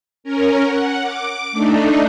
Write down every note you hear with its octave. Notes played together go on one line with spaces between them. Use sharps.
C#4 A#4
F#5
D6
A3 D4 D#4